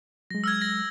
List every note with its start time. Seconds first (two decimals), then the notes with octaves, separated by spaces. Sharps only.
0.31 F#3 G#3 A#6
0.44 E6 F6 G#6
0.62 A#6